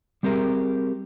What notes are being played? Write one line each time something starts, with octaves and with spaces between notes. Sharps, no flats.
G3 C4 G4 G#4 A#4 E5